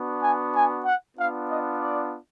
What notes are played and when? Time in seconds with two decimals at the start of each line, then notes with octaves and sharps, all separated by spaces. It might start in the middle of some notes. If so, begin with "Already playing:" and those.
Already playing: B3 D4 F#4
0.21 G#5
0.53 G#5
0.84 F#5
1.15 B3 D4 F4 F5
1.48 D#5
1.80 D5